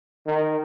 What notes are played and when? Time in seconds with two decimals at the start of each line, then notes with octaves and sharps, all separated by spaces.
0.26 D#3